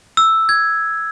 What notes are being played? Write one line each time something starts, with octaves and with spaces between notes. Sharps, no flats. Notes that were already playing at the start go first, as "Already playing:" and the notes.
E6
G#6